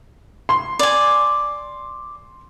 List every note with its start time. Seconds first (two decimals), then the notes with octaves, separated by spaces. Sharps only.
0.49 C6
0.79 D5 G#5